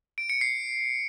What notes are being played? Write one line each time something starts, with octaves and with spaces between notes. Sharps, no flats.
D7
C#7
C7